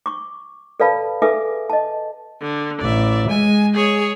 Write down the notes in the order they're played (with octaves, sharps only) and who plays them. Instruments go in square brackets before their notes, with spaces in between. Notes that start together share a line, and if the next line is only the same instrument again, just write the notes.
[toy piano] C#6 D6
A4 B4 D5 F5 A5 B5
G#4 A4 B4 E5 G#5 D6
D#5 A5
[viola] D3
[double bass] A1 [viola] D5 E5
[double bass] G#3 [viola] G#5
[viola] G#4 C#5